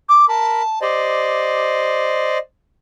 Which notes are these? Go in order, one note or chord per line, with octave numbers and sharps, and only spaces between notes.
D6
A#4 A5 B5
G4 C5 D5 D#5